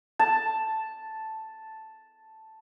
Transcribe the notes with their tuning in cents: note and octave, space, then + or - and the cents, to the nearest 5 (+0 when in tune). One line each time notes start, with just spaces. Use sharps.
A5 +0